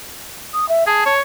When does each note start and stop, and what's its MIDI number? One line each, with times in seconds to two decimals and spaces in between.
0.53 0.68 87
0.69 0.86 76
0.87 1.05 68
0.87 1.14 81
1.06 1.22 73